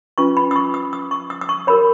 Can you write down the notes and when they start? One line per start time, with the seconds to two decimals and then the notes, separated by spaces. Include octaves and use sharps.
0.18 C#4 F4 B4 C#6
0.37 B5
0.51 D#6
0.56 C#6
0.74 D#6
0.93 D#6
1.11 C#6
1.30 D#6
1.41 D#6
1.49 C#6
1.67 F#4 A#4 C#5 B5